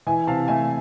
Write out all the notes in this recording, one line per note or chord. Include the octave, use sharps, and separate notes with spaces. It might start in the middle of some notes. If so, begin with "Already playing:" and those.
E3 E5 G#5
C3 F5 A5
A3 E5 G#5